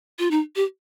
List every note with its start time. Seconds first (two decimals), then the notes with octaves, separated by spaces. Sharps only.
0.19 F4
0.31 D#4
0.56 G4